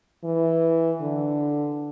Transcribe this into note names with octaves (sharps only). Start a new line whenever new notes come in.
E3
D3